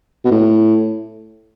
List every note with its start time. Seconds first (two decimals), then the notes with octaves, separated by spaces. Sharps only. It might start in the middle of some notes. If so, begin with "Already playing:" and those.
0.24 B2
0.31 A2